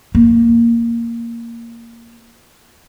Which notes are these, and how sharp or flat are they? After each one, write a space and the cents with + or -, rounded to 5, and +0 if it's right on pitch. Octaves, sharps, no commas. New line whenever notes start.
A#3 -5